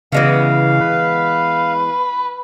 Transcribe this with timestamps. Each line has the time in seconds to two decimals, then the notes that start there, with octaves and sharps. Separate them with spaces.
0.12 C#3 E3 G#3 B3 F5
0.81 B4